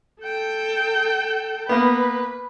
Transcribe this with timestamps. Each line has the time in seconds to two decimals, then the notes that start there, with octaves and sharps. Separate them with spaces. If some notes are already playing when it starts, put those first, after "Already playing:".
0.20 A4 G5
1.69 A#3 B3 B4